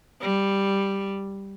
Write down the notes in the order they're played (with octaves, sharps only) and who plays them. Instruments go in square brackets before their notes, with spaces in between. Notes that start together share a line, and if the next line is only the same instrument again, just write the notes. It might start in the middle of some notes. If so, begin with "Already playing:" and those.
[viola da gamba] G3